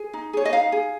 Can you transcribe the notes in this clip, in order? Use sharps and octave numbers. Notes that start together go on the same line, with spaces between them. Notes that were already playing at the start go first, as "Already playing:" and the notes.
Already playing: G#4
D#4
G#4 C#5
D#5
D#4 F5
G#4